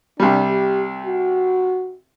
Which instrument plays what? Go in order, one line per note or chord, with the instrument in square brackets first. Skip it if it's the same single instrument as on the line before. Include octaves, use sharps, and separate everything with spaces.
[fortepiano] C2 G3 [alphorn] D4
[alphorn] G4
F#4